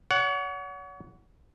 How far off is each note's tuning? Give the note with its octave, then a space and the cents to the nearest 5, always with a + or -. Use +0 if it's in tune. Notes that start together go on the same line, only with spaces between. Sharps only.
C#5 +40 F#5 +0